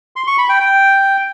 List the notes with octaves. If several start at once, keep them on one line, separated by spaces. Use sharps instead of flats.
C6
C#6
B5
G5
G5